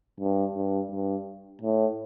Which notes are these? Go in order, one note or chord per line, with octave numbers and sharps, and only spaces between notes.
G2
G2
G2
A2